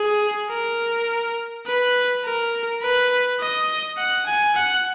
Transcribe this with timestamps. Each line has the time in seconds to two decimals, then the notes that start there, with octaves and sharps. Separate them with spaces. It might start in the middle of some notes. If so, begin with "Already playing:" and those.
Already playing: G#4
0.50 A#4
1.66 B4
2.24 A#4
2.82 B4
3.40 D#5
3.98 F#5
4.26 G#5
4.56 F#5